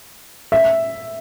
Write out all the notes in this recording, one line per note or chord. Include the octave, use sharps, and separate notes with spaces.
E5